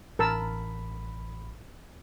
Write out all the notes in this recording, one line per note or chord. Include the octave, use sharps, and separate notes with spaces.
A1 A#4 A5 B5 E6